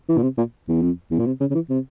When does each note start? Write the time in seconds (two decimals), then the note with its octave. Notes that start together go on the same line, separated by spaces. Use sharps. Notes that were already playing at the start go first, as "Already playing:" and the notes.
0.09 E3
0.18 A#2
0.23 C3
0.38 A#2
0.69 E2
0.82 F2
1.11 E2
1.19 A#2
1.27 C3
1.40 C#3
1.51 C#3
1.55 E3
1.70 C3